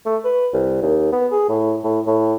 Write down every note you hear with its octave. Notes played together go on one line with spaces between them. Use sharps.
A3
B4
C2
D#2
B3
G#4
A2
A2
A2